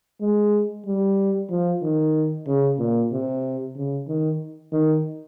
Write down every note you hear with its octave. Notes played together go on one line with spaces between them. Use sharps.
G#3
G3
F3
D#3
C#3
A#2
C3
C#3
D#3
D#3